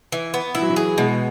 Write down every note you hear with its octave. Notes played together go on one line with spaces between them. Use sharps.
E3
B3
E3 E4
F#3
E3
G#4
B2 G#3